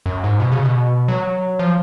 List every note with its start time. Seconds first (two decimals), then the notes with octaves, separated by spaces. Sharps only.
0.06 F#2
0.24 G#2
0.40 B2
0.52 C#3
0.63 B2
1.08 F#3
1.59 F3